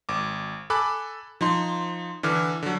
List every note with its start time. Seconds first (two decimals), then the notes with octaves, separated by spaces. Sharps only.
0.09 G#1 D6
0.70 A4 G#5 B5 D6 F#6
1.41 F3 D#4 C6
2.23 D3 E3 D6 F6
2.63 D3 F#3